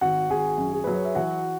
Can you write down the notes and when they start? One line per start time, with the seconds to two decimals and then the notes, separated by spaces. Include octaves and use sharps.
0.01 G#1 F#4 F#5
0.30 G#1 G#4 G#5
0.58 F#2
0.73 G#4
0.84 F#3 B4
0.94 C#5
1.05 E5
1.15 E3 F#4 F#5